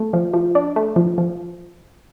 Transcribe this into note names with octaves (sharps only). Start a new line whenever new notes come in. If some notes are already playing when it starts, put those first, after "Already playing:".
Already playing: A3
F3
F3
D4
A3
F3
F3